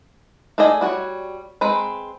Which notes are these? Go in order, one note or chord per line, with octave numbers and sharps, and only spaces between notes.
A3 G#4 D5 D#5 G#5
G3 F#4 C#5
G#3 C4 B4 A#5